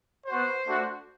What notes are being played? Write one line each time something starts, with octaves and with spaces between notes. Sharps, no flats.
B3 F#4 C5
A3 D4 F#4